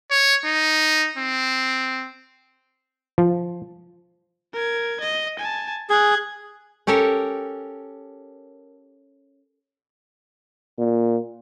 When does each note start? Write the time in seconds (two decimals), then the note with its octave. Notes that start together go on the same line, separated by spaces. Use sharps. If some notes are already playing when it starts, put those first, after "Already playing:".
0.11 C#5
0.45 D#4
1.17 C4
3.18 F3
4.53 A#4 G#6
5.01 D#5
5.39 G#5 A5
5.90 G#4 F#6 G#6
6.87 C#4 G4 A4 A#4 C#5
10.79 A#2